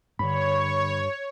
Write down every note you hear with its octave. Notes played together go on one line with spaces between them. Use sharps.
G2 D3 C#5 B5